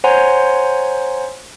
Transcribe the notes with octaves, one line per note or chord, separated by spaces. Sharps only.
C5 C#5 F#5 G#5 A#5 C6